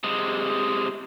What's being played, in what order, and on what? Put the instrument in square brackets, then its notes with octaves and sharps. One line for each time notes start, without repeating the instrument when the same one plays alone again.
[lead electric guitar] C3 G#3